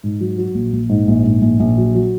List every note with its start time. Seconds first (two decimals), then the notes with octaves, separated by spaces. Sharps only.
0.03 G#2
0.21 F#3
0.38 F#3
0.55 A#1
0.73 A#1
0.89 G#2
1.08 A#1
1.25 G#2
1.42 A#1
1.60 A#1
1.78 F#3
1.95 F#3